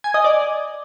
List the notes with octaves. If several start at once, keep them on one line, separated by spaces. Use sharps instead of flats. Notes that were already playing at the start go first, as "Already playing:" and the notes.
G#5
D#5
D5